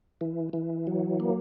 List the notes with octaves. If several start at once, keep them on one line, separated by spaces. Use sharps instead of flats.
E3
E3
F#3
A#3